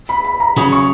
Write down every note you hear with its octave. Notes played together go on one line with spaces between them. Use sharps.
B5
B5
A#5
C#3 F#3 C#4 G#4 B5
C#6